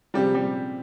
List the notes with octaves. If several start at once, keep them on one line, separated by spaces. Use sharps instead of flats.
C3 F3 G3 G#3 G4
G3 G4